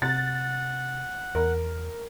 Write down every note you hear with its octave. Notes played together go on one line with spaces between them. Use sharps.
C3 F#5 A6
E2 A#4